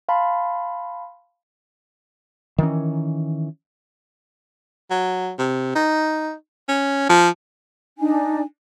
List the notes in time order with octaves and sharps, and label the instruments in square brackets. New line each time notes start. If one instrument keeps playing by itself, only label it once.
[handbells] F5 A5 B5 C6
[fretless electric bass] D#3 E3 C#4
[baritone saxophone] F#3
C3
D#4
C#4
F3
[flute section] D4 D#4 G#5